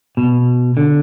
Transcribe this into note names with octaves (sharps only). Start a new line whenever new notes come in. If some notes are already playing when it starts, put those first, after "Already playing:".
B2
D3